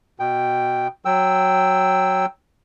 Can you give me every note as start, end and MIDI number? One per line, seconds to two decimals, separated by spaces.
0.20 0.88 47
0.20 0.88 79
1.05 2.26 54
1.05 2.26 79
1.05 2.26 88